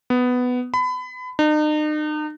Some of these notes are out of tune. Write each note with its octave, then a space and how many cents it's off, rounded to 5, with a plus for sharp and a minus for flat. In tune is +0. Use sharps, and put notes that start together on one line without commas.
B3 +10
B5 +30
D#4 -40